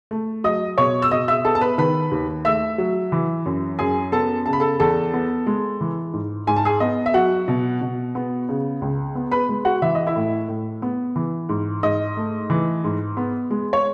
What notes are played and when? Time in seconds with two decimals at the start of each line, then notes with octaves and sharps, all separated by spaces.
0.11 A3
0.44 F#3 D#5 D#6
0.78 B2 C#5 C#6
1.02 E6
1.11 B2 D#5 D#6
1.28 E5 E6
1.44 B3 A4 A5
1.55 A5
1.61 B4 B5
1.78 D#3 B4 B5
2.11 D#2
2.45 A3 E5 E6
2.78 F#3
3.12 E3
3.46 F#2
3.79 F#2 G#4 G#5
4.12 B3 A4 A5
4.46 C#3 A5
4.53 B5
4.60 A4 A5
4.80 E2 A4 A5
5.13 B3
5.47 G#3
5.81 E3
6.13 G#2
6.47 G#2 G#5
6.56 A5
6.65 G#4 G#5
6.80 B3 D#5
7.06 E5
7.14 F#3 F#4 F#5
7.48 B2
7.81 B2
8.15 B3
8.49 C#3
8.82 C#2
9.15 B3
9.31 B4 B5
9.49 G#3
9.65 F#4 F#5
9.82 E3 E5
9.95 D#5
10.07 E4 E5
10.16 A2
10.49 A2
10.82 B3
11.16 E3
11.49 G#2
11.83 G#2 D#5
12.17 A3
12.50 E3
12.84 G#2
13.17 B3
13.51 G#3
13.73 C#5